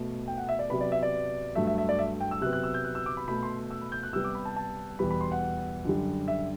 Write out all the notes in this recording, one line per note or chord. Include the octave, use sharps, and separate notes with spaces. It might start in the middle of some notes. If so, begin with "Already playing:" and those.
Already playing: B2 A3
G5
F#5
E5
D5
C3 F#3 B3 B5
D5
E5
D5
G2 F#3 A3 E5
E5
E5
D5
E5
G5
E6
C3 F#3 B3 F#6
F#6
E6
G6
F#6
E6
D6
B5
B2 A3 B5
C6
E6
B5
G6
F#6
C3 G3 B3 E6
D6
B5
A5
A5
E2 B2 G3 B3 B5
B5
C6
F#5
F#2 D3 G3
E5